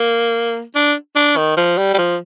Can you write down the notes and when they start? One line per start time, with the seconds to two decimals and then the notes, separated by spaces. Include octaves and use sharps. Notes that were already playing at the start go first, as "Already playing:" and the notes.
Already playing: A#3
0.75 D4
1.16 D4
1.37 D#3
1.57 F3
1.77 G3
1.94 G3
1.98 F3